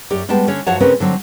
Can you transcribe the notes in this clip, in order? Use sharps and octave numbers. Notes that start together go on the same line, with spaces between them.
F#2 G4 D5
G3 G#3 B3 G5 A5
D3 C#4 C#5
F#2 F3 F#4 C#5 F#5 A5
C#3 C4 C#4 A#4 B4 C#5
D3 F#3 C4